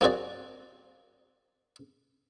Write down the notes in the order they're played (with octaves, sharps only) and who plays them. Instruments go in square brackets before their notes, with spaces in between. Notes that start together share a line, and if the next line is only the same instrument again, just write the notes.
[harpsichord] A#3 C4 F#4 G#4 D5